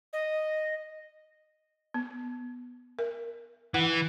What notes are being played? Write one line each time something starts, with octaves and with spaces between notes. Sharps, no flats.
D#5
B3
A#4
E3 F#5